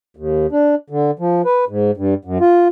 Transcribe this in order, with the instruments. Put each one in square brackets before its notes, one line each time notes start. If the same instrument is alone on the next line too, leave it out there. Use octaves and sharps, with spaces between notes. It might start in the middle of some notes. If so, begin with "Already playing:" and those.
[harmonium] D#2
D4
D3
F3
B4
G#2
G2
F#2
F4